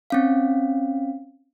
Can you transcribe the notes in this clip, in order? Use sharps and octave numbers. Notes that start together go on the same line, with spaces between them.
C4 C#4 F5